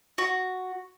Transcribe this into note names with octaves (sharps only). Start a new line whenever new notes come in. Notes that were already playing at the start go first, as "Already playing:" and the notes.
F#4